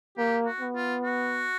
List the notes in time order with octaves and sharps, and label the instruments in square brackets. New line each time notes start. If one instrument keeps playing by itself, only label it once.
[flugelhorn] A#3 [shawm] G4
[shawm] F#4
[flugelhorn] B3
[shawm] F4
F#4